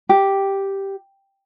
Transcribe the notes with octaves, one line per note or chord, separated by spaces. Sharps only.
G4